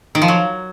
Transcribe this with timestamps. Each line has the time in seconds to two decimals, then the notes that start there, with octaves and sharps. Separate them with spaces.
0.15 D#3
0.22 F3
0.28 F#3